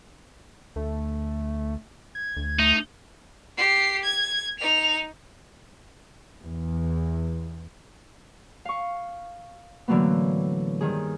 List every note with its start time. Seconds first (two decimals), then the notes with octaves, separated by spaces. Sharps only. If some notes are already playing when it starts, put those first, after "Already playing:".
0.76 D2 A3
2.15 G#6
2.37 D2
2.59 A3 D#4
3.57 G4 C7
4.03 G#6
4.59 D#4 F7
6.42 E2
8.65 F5 C#6
9.88 A2 D3 E3 F#3 A#3 B3
10.81 G2 D#3 G#4